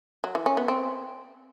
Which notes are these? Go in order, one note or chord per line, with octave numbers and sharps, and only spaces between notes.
F#3
E3
C#4
B3
C4